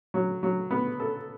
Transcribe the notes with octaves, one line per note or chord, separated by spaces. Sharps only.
F#3
F#3
B3
A4